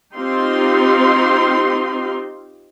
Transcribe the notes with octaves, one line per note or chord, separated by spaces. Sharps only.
C4 D#4 F4 G4 C6